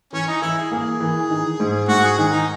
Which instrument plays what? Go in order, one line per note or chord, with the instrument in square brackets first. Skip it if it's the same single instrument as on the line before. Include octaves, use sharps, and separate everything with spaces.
[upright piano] E3 [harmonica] C#4
[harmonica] D#4
[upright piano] E3 [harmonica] E4
[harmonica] G#4
[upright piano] A#3 [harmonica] G#4
[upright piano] E3
D#3
G#2
[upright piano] G#2 [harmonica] F#4
[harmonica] G#4
[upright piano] D#3 [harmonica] G#4
[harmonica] D#4